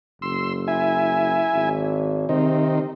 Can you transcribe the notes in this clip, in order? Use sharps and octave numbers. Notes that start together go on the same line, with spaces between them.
F#1 C6 E6
E4 E5 G#5
G#1
C3 D#3 C4 D#4